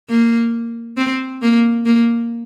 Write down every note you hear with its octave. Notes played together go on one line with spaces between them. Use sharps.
A#3
C4
A#3
A#3